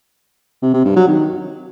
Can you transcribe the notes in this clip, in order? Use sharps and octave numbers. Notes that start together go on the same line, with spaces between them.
C3
C3
G2
F#3
D#3